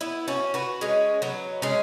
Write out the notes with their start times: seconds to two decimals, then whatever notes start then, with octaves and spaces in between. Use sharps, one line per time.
0.01 B3 E4
0.28 C#4 F#4
0.54 F#4 B4
0.81 G#3 C#4
1.22 F#3 B3
1.62 G#3 C#4